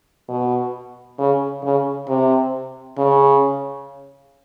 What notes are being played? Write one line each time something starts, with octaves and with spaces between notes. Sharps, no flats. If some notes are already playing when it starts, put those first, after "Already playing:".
B2
C#3
C#3
C3
C#3